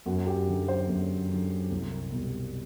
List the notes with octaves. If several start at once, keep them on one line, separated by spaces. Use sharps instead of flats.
F#2 F#4
G4
D3 F#3
C5
F#2
D3 F#3
C2
B2 G3